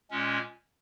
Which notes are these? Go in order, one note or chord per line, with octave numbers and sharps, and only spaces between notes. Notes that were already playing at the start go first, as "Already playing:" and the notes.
A#2 G#3 C#4